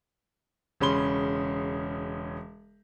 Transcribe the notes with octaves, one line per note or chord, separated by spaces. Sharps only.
E1 C#3 C#4 B5 C6 G7